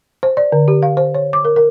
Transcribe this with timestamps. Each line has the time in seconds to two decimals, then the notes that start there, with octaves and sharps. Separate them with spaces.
0.23 C5
0.37 D5
0.52 D3
0.68 G4
0.83 F5
0.97 C5
1.15 C#5
1.33 D6
1.45 A#4
1.56 A#4